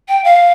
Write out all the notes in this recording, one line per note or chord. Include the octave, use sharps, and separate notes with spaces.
G5
F5